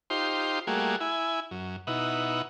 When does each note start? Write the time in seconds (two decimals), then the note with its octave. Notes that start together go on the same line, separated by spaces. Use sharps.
0.10 D#4 F4 G4 C5 C6
0.67 G3 A3 A#3 F#4 G#4
1.01 E4 G#5
1.51 F#2
1.87 B2 D#4 E4 F#5